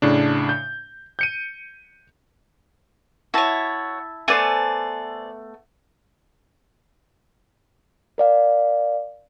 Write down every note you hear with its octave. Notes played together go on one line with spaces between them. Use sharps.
A2 C#3 D4
G6
G6 C#7 D#7
E4 F#4 C#5 E5 A5
A3 B3 C5 D5 G#5
A#4 D5 F5